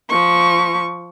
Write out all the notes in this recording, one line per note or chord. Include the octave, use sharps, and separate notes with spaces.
F3 C#6